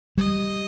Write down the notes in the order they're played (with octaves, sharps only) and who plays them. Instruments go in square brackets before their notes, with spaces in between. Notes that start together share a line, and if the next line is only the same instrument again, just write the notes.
[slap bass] G3 [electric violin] D#5